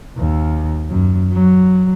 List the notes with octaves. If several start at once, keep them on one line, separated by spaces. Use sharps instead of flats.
D#2
F#2
F#3